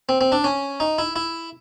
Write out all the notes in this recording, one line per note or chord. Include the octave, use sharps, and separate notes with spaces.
C4
C4
D4
C#4
D#4
E4
E4